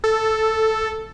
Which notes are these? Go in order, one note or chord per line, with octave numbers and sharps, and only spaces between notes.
A4